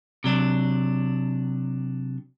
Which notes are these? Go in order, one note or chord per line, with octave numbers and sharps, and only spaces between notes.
C3 F#3 D4